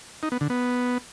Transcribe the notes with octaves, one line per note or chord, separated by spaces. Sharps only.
D#4
B3
D3
B3